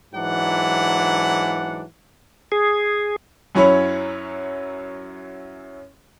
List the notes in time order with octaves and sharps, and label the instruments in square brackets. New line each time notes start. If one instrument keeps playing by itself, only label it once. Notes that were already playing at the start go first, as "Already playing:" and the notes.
[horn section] G#2 E3 F#3 D4 F#5
[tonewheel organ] G#4
[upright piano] F#2 F#3 C#4 E4 C#5 B5